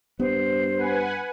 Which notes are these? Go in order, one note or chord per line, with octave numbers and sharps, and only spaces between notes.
G2 B3 C5
B4 F#5 G#5